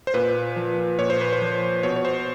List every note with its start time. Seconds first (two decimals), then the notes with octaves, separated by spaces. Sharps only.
0.07 C5
0.14 A#2 B4
0.56 F3
0.99 A#2 C#5
1.10 C5
1.21 B4
1.33 C5
1.42 F3
1.83 B2 C#5
1.96 C#5
2.05 C5